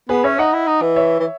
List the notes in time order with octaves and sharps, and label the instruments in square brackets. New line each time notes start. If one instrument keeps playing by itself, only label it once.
[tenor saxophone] B3 [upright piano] G#4 B4
[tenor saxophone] C#4 [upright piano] C#5 E5
[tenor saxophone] D#4 [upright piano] D#5 F#5
[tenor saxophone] E4
D#4
E3
[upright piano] C#5 E5
[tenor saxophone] E3